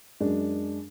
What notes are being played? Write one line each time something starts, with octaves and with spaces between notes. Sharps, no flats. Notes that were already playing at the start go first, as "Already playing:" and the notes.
F#2 G#3 D4